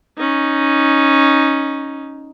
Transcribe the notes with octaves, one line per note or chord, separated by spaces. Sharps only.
C#4 D#4